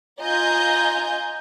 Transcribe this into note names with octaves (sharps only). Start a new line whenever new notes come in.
F4 D#5 G#5 A#5 G6